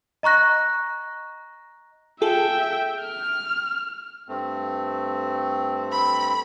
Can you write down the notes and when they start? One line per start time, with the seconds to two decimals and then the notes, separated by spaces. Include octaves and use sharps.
0.23 D#5 A#5 C#6 F#6 A#6
2.22 F4 G#4 A4 E5 G5
3.02 F6
4.28 G2 A3 C4
5.92 B5